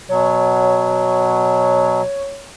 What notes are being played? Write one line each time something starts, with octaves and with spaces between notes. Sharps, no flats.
B2 F#3 C#5